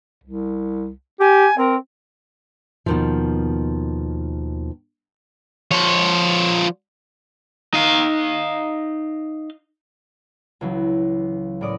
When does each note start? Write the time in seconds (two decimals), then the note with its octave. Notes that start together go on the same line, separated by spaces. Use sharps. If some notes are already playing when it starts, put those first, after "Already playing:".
0.24 C2
1.20 G4 G#5
1.58 C4 A#4
2.86 D#2 B2 D#3 F3
5.71 F3 C#5
7.74 D#4 F5
10.61 C#2 E3 F#3
11.61 A2 C#4 A#4 D5 D#6